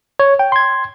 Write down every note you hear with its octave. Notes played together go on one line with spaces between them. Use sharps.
C#5
G5
C6 G#6